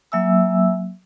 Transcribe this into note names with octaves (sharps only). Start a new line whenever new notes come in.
F#3 A#3 E5 G#5 E6